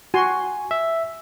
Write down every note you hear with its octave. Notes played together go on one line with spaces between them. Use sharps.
F#4 G#5 C6
E5